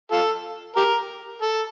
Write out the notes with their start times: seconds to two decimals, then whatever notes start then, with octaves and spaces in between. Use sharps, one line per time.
0.12 F4 A4
0.76 G4 A#4
1.42 A4